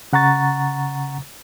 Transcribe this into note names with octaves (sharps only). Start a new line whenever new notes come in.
C#3 F#5 A#5 C#6 A6